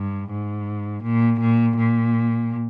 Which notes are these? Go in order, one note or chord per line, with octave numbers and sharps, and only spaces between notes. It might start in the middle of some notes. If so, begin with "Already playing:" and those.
Already playing: G2
G#2
A#2
A#2
A#2